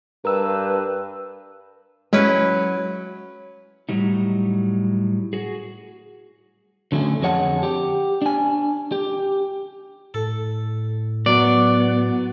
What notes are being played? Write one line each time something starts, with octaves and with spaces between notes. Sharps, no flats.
G2 A#4 B4 E6
F#3 G#3 C#4 E4 B4
A2 F#3 G3 D#4
F#4 G#4
D3 F#3 A3 C#4
F2 D3 G#4 C#5 F#5 A5
G4
D4 G#5
G4
A2 A4
F#2 F#3 B3 D5